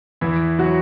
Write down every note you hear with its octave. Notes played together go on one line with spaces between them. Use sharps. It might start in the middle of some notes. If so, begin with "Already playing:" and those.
E2 E3 E4
F#3 F#4